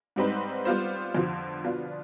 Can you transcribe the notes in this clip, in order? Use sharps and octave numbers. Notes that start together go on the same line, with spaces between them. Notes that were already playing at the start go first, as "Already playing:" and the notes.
G#2 G3 C4 D#4 B4
G3 B3 F4 C5
F2 D3 F3
B2 B3 D4 F4